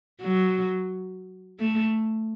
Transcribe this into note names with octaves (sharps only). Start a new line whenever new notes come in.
F#3
A3